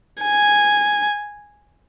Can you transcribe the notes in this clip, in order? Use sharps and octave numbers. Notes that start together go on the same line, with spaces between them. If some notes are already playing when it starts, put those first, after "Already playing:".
G#5